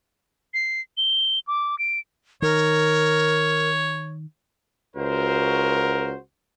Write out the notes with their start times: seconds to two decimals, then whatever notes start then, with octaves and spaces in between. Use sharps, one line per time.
0.54 C7
0.97 G7
1.47 D6
1.79 D7
2.42 D#3 A#4 C#5
4.96 C#2 F#4 A#4 C5